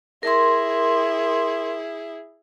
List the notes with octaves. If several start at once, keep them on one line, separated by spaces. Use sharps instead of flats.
E4 G#4 A#4 C6